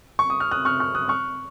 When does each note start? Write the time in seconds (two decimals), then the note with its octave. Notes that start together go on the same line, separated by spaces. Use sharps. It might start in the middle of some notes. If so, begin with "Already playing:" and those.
0.19 C#6
0.30 D#6
0.40 F6
0.51 D#6 F#6
0.65 C#6 F6
0.80 C#6 F6
0.95 D#6 F#6
1.09 C#6 F6